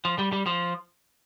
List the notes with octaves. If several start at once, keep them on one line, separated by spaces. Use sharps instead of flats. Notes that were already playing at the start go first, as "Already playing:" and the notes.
F3
G3
G3
F3